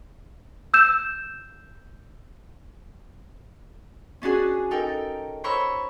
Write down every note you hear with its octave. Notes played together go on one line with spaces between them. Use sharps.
E6 G6 E7
C#4 D4 F#4 G#4
D#4 A4 A#4 G5
C5 C#5 A#5 B5 C#6 E6